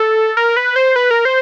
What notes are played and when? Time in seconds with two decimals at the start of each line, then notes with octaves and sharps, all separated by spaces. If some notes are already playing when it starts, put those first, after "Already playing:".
Already playing: A4
0.37 A#4
0.56 B4
0.76 C5
0.96 B4
1.11 A#4
1.25 C5